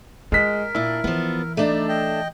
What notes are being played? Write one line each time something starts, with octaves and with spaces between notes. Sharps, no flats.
G#3 F4 A#4 B6
A#2 D4 E4
E3 F3 B3
A3 D4 D#4 D5
D#5 G5